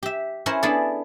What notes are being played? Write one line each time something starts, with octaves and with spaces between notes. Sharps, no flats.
G4 E5
C#4 E4 A#4 C5 C#5
B3 D4 E4 G#4 A4 D5